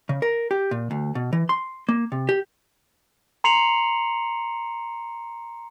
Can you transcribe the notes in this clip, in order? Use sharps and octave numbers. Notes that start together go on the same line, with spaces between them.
C#3
A#4
G4
A#2
D2
B2
E3
C6
A#3
C3
G4
A#5 C6 C7 C#7 F7 F#7